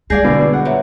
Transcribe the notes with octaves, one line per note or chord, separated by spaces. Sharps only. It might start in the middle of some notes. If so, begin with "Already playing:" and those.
G3 G#3 G#4 D5 F5 G6 A#6 C7
B2 D3
B4
F#5
A#2 B4 C#5 E5